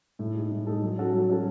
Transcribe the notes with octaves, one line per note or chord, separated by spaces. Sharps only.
A2
G#3 D#4 A4
A2
G#3 D#4 A4
F#3
C#4 F#4 A4
F#3
C#4 F#4 A4